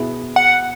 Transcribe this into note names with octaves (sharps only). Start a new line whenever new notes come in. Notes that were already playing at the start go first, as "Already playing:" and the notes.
Already playing: B2 B3 E4 G#4
F#5